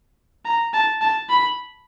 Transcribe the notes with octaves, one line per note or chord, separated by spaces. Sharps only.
A#5
A5
A5
B5